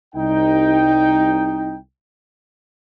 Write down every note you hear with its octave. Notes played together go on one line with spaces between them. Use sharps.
C2 D#4 G5